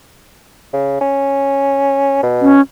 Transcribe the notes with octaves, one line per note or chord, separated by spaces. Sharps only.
C#3
C#4
B2
C#4